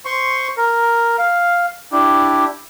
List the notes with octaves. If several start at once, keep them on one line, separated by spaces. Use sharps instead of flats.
C5 C6 C#6
A#4
F5
D4 E4 G4